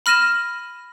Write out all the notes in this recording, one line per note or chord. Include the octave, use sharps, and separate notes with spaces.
B5 F6 A#6 D#7 E7